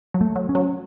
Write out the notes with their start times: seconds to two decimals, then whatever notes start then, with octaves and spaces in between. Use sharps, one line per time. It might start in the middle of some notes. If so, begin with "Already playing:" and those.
0.14 F#3
0.21 A3
0.36 F#3
0.49 C#4
0.55 F#3